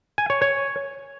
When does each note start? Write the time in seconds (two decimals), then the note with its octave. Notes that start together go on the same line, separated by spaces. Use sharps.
0.18 G#5
0.30 C#5
0.42 C#5